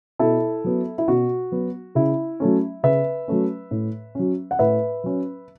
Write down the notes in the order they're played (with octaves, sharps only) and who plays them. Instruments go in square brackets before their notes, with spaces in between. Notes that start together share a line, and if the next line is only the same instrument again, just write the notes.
[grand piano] B2 E4 A4
F#3 B3
E4
B2 F#4
F#3 B3
C#3 E4
F#3 A3 C#4
C#3 B4 E5
F#3 A3 C#4
A2
F#3 C#4
F#5
A2 B4 E5
F#3 C#4